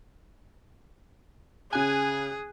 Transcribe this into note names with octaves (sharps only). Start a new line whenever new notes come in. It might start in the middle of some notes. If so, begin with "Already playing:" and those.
C#3 G#4 G#5 F#6